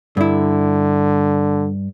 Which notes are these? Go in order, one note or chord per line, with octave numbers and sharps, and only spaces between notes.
G2 D3 E4